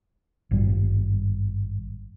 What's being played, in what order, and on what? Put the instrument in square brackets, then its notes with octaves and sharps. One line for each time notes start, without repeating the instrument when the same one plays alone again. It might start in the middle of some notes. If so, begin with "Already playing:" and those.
[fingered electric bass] G#1 G2 G3